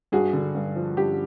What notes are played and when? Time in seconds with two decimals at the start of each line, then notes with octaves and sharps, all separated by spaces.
0.12 G2 F#4 G#4
0.33 D3
0.55 G2
0.76 F3
0.97 G2 G4